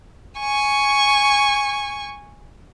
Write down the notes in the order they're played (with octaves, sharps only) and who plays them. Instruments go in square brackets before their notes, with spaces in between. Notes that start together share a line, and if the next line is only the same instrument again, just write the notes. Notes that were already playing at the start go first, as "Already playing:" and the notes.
[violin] G#5 C#6